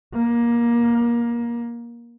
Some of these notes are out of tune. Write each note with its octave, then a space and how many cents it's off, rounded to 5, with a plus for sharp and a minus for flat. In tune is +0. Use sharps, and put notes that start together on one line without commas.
A#3 +20